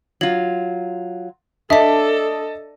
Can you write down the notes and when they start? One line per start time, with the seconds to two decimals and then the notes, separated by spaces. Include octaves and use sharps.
0.21 F#3 F4 F#7
1.70 D4 A4 D#5 E5 A5 B6